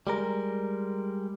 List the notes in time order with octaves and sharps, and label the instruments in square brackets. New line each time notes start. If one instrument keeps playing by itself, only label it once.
[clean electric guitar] G3 G#3 A#4